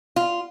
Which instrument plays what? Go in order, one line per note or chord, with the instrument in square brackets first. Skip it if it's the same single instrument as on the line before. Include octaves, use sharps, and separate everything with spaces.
[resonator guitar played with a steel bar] F4